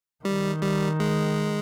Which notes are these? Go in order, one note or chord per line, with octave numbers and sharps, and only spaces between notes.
D#3 G3
G3
G#3